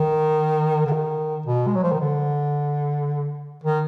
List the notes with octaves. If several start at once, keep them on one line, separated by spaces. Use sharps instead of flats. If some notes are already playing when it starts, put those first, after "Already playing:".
Already playing: D#3
D3
D#3
B2
G#3
F#3
F3
D#3
D3
D#3